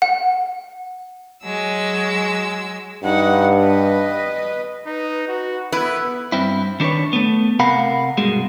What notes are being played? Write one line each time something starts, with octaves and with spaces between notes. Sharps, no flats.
F#5
F#3 G#3 E6
G2 D#4 F#5
B4 D#5
D#4 B4
F#4
B3 E4 B4
G2 C4 E4
D#3 D4 A#4 B4 C#5
A3 B3
C3 A#4 F5 F#5 B5
G2 B2 G#3